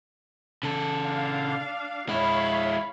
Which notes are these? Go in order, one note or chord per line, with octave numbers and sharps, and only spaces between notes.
C#3 A4
D4 F5
G#3 E4 C#5 F5 B5